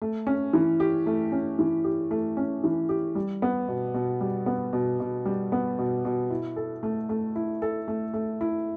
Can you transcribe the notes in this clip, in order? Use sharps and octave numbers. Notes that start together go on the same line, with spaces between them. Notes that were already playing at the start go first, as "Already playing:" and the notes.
A3
C#4
E3
G4
A3
C#4
E3
G4
A3
C#4
E3
G4
G3
B3
B2
B2
G3
B3
B2
B2
G3
B3
B2
B2
E4
A4
A3
A3
E4
A4
A3
A3
E4